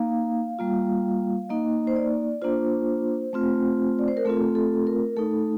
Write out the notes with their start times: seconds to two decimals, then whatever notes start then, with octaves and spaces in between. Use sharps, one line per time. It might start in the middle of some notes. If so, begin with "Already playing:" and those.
Already playing: A#3 D#4 F5
0.59 G3 A#3 F4
1.49 A#3 D#4 D#5
1.87 C5
1.96 D5
2.42 A#3 D4 F4 C5
3.33 A3 C4 F4
3.99 D5
4.08 C5
4.17 A#4
4.25 A3 C4 F4 A4
4.55 A4
4.87 A#4
5.17 A3 D#4 A4